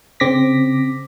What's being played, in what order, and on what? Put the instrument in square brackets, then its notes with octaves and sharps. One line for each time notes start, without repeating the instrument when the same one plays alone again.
[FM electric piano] C#3 C4 D6 A#6 B6